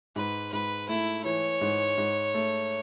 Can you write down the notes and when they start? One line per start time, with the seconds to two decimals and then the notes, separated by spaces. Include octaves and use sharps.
0.16 G#2 B4
0.52 G#2 B4
0.89 A3 E4
1.25 E3 C#5
1.61 G#2
1.98 G#2
2.34 A3